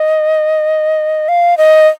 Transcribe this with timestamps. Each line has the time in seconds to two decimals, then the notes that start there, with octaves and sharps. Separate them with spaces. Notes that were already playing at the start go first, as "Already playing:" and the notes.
Already playing: D#5
1.29 F5
1.58 D#5